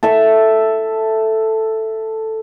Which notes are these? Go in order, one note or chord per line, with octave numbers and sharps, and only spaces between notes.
A4 E5